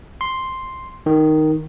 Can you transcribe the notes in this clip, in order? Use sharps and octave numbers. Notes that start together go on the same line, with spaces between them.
C6
D#3